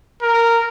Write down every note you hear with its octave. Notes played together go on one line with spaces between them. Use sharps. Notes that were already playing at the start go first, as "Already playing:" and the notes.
A#4